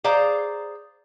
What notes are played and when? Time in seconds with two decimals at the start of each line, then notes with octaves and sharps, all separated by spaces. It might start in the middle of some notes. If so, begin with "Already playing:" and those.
0.04 G#4 C5 D5 F5 A#5